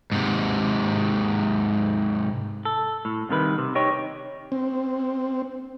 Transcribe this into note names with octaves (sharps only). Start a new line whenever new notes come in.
G#2 C3
A4
A2
C2 C3 D#3 B4
C3
D#4 G4 C#5
C4